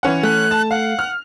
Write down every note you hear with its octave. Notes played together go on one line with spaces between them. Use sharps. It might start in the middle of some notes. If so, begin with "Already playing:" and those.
E3 C#4 F#5
A3 F#6
A5
F5 F#5
F6